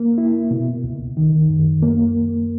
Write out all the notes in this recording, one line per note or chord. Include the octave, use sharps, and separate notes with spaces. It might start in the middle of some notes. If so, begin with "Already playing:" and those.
Already playing: A#3
E4
B2
C#2
D#3
F#2
A#3